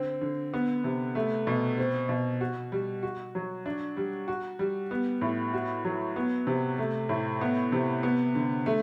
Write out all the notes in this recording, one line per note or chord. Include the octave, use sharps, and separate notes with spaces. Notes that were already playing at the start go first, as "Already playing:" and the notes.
Already playing: D3 C4
D3
B3
C3
A3
B2
C4
B2
F#4
G3
F#4
F#3
D4
G3
F#4
G3
B3
A2
F#4
F#3
B3
C3
A3
A2
B3
C3
B3
D3
A3